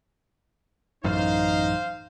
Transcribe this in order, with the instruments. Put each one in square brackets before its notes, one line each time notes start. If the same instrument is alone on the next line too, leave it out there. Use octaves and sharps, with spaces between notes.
[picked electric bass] A1 F#2 [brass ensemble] D#4 [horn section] C5 F5